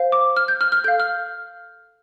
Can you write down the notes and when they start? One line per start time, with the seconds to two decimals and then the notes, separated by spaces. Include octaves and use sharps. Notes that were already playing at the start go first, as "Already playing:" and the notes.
Already playing: C5 F5
0.12 D6
0.37 F6
0.48 G6
0.61 F6
0.72 F6
0.84 A4 G6
0.88 F5
1.00 F6